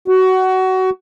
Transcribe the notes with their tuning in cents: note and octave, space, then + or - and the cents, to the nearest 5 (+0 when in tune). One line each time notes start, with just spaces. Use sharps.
F#4 +20